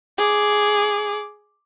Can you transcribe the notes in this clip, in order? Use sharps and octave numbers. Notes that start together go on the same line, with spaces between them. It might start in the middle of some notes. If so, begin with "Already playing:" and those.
G#4 D6